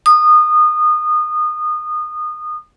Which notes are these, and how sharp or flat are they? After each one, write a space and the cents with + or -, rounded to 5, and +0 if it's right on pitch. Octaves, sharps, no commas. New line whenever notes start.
D#6 -25